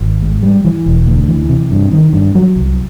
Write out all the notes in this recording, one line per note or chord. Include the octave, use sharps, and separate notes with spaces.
G#1
G#2
G3
E3
E1
D2
E3
C3
G2
D#3
G2
F#3
C2